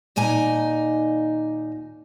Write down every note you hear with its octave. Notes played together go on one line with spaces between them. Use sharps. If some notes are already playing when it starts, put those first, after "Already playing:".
D#2 A#2 D#4 G#5